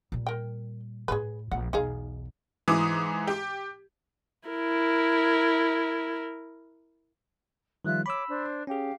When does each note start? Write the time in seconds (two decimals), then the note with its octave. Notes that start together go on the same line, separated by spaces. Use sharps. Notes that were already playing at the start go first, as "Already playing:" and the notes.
0.12 A#2 G3
0.27 A#4 G5
1.08 A2 E4 G#4 B4
1.51 A#1 A3 F#5
1.73 B1 E2 D#4 G#4 F5
2.68 G#2 E3 D6 D#6
3.27 G4
4.48 E4 A#4
7.85 D#3 F3 G3 F4 E5 F#6
8.06 C#5 B5 D6 E6
8.29 D4 C5
8.67 C#4 G4 G#4 F5